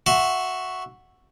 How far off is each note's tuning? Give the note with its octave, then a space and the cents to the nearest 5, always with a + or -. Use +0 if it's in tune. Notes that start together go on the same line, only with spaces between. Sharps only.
F#4 -5 E5 +0 C6 +10